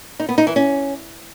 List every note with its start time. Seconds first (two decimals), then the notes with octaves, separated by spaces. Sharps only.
0.20 D#4
0.29 B3
0.38 D#4
0.47 E3
0.56 C#4